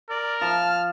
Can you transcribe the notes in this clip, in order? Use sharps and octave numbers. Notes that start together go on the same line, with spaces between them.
A#4 D5
F3 A5 F6